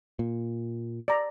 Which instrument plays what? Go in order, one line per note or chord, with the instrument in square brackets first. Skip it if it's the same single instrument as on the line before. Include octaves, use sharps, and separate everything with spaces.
[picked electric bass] A#2
[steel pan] D5 A#5